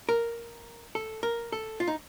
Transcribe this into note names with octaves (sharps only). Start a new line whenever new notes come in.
A#4
A4
A#4
A4
F4
D#4